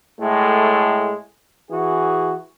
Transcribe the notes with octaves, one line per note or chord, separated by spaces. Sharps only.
A2 G#3 A3
E3 F#4 G#4